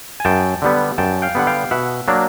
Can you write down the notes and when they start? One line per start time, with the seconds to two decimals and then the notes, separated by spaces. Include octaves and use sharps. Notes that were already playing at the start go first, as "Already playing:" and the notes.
0.20 G#5
0.25 F#2 G5 A5
0.62 D3 G3 B3
0.98 F#2 G5 A5
1.22 F5 G5
1.35 D3 G3 B3 F#5
1.47 F5 G5
1.71 B2 E5 F#5
2.08 F#3 A#3 D4